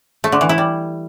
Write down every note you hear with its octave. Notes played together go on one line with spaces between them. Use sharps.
A3
D3
E3
E4
G3